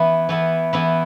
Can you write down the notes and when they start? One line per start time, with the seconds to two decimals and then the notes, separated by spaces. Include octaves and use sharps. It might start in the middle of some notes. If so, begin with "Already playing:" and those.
Already playing: E3 B3 E4
0.29 E3 B3 E4
0.73 E3 B3 E4